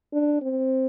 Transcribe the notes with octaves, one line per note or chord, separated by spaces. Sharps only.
D4
C4